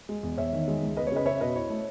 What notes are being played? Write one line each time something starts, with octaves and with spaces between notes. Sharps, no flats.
G#3
E2
E2 C#5 E5
D#3
G#3
C#2
B3 B4 D#5
C#5
C#3 B4 D#5
C#4 C#5 E5
B2 B4 D#5
E4 C#5
A3